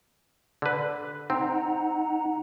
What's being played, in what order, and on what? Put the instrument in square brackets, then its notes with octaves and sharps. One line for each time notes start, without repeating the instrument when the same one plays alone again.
[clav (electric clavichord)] D3 B4
[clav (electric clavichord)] C4 [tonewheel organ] D#4 F#5 A#5